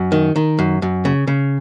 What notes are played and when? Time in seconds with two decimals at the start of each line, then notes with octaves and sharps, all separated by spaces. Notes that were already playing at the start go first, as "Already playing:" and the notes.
Already playing: F#2
0.12 D#3
0.36 D#3
0.59 F#2
0.82 F#2
1.05 C#3
1.27 C#3